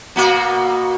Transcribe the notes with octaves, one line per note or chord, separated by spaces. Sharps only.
B2 A#3 F#4